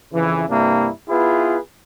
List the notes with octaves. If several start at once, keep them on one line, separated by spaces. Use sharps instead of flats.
F2 C#3 E3
G2 C3 A#3 D4 E4
B3 E4 F4 G#4 B4